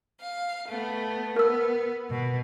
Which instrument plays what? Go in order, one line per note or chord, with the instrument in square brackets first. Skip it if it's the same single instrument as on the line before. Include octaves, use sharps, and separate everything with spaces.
[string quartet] F5
A3 B3
[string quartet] B3 [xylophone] A#4 E6
[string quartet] B2